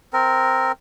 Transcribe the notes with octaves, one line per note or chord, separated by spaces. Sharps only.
C4 A#4